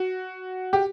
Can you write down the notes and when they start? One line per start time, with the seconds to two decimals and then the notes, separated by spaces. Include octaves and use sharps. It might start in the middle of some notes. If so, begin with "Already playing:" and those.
Already playing: F#4
0.73 G4